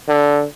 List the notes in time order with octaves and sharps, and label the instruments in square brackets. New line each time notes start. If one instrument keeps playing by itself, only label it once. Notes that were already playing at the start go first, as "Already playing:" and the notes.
[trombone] D3